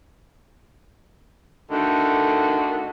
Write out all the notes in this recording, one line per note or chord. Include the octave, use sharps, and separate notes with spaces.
D3 D#3 A3 F#4